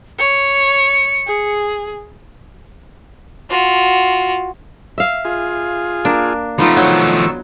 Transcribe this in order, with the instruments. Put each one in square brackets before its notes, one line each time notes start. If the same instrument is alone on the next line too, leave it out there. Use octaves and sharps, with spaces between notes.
[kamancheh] C#5 [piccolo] C#7
[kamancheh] G#4
[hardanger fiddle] F4 F#4
[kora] E5 F5
[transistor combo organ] F4 G#4
[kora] A#3 [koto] D4
[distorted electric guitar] F3 A3 [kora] B3 D#4 F4
[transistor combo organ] D#3 C#6 E6 [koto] F#3